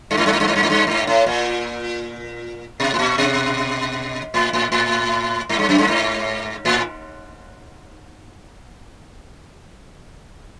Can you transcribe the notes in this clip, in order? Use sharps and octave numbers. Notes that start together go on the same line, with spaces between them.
G2
G#2
G2
G#2
G2
G#2
G2
G#2
G2
G#2
A2
A#2
B2
A2
A#2
B2
A2
A2
A2
G#2
G2
F#2
G2
G#2
A2